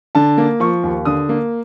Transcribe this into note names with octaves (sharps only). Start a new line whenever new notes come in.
D3 A5
A#3
F3 C#6
D#2
D3 D#6
A#3